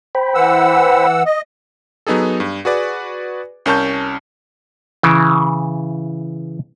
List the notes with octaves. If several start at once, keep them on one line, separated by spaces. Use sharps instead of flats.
C5 G5 B5
E3 F#5 E6
D#5
F#3 B3 D#4 G#4 A4
G2
F#4 G#4 B4 D5
C2 C#4 A#4 A5 C#6 G6
C#3 E3